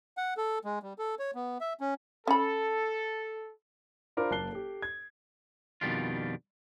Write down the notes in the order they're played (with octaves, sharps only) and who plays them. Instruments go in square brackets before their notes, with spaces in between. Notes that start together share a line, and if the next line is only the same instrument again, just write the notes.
[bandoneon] F#5
A4
G#3
G3
A4
C#5
B3
E5
C#4
[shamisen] C#4 B5 [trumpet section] A4
[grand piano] D4 F4 A#4 C5 B5 D6
F#1 A#3 A5 F#6 C7 G7
G4 A4
G#6
[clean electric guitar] F2 B2 D#3 G3 D4 F4